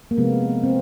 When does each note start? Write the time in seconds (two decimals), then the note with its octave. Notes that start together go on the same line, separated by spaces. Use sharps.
0.11 A#3
0.17 C3 F3 G#3 B3
0.64 C4